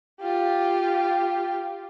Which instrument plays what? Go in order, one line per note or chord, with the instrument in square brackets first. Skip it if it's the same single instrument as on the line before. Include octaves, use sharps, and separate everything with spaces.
[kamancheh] F4 G4